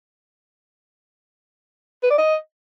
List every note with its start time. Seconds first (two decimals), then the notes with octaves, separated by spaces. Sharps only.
2.03 B4
2.11 D5
2.18 D#5